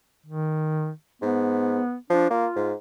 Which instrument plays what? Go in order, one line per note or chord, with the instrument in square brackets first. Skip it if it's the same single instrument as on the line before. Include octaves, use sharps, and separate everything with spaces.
[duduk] D#3
[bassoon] G#2 [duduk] B3
[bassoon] F3 [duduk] D4
[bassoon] A#3 [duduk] F4
[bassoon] G#2